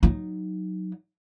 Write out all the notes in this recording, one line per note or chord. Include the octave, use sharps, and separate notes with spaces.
F#3 D#4